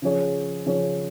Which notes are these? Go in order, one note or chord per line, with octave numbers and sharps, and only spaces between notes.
C#3 F3 C#4 G#4 C#5
C#3 F3 C#4 G#4 C#5